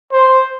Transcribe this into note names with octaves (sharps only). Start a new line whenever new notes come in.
C5